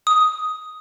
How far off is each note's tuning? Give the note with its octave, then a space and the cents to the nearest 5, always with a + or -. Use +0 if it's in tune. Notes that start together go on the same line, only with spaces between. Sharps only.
D#6 +5